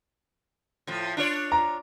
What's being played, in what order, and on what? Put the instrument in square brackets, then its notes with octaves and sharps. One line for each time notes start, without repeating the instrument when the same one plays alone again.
[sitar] A2 F3
D4 F4 C#5
[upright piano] A#5